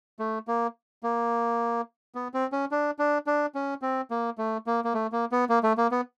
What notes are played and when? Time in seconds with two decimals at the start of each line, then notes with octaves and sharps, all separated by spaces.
0.19 A3
0.48 A#3
1.03 A#3
2.15 B3
2.34 C4
2.52 C#4
2.71 D4
2.99 D4
3.27 D4
3.55 C#4
3.82 C4
4.11 A#3
4.38 A3
4.67 A#3
4.84 A#3
4.94 A3
5.12 A#3
5.32 B3
5.49 A#3
5.63 A3
5.78 A#3
5.91 B3